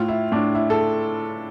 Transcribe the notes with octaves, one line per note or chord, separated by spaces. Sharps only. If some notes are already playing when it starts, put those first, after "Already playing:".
Already playing: A2 F4
E4
A2 D4
E4
A4